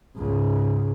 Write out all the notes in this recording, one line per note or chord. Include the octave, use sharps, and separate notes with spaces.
C#2 G#2